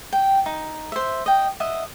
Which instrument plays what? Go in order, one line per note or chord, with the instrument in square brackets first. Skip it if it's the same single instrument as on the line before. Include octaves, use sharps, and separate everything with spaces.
[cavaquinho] G5
D#4
C5 E5
D#5 G5
D#5 E5 F#5